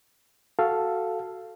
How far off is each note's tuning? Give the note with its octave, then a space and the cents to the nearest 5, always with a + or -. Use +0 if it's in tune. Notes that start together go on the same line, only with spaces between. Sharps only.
F#4 +0 A4 +0 F5 -10